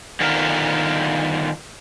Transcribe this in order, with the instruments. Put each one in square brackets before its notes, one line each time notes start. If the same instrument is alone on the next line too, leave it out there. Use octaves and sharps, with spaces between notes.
[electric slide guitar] D3 D#3 B3 F4 A#4